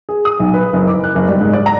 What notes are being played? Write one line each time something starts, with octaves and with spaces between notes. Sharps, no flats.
G#4
D#6
B1
B4
F#1
D6
F#6
F#1
G3
G#2
D5
A#5